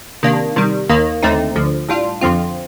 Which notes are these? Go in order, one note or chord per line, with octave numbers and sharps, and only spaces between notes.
C3 D#3 A#3 D4
C3 D#3 G3
D#2 D#3 A#3
D#2 D3 A3 C4 D#4
D2 D3 F3
A2 G3 D4 F4
F2 D3 F3 C4 F4